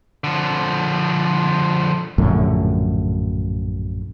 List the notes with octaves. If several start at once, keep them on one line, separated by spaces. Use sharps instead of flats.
D3 F3
A#1 F#2 A2 D3